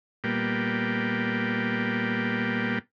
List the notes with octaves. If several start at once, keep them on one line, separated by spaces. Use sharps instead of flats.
A#2 G3 A#3 B3 G5